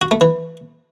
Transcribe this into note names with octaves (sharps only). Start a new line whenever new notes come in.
F#4
A3
E3